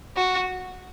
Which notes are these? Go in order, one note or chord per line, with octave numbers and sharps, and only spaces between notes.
F#4